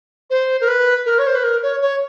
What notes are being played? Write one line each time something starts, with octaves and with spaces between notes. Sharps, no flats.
C5
A#4
B4
A#4
C#5
C5
B4
A#4
C#5
C#5